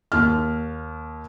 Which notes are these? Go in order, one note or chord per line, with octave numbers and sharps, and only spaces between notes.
D#2 F6